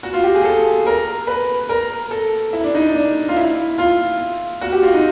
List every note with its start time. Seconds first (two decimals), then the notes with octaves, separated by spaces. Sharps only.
0.03 F#4
0.13 F4
0.24 G4
0.35 G#4
0.45 A4
0.87 A#4
1.27 B4
1.69 A#4
2.11 A4
2.53 E4
2.64 D4
2.75 D#4
2.95 D4
3.28 F4
3.37 E4
3.78 F4
4.61 F#4
4.72 G4
4.83 F4
4.94 D#4